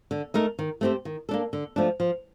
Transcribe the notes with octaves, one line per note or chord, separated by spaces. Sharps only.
D3
A3 D#4 A#4
D#3
A3 C4 G4 C5
D#3
A#3 D4 A4
D3
F3 A3 D4
F3